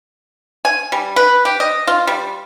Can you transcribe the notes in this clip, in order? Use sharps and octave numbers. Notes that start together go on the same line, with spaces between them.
G#5
G3
B4
G4
D#5
F4
G3